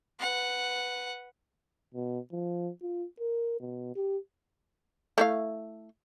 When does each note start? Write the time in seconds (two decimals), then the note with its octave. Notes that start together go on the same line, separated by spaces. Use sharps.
0.20 B4 F#5
1.94 B2
2.32 F3
2.82 F4
3.20 A#4
3.60 B2
3.96 G4
5.18 A3 E4 F5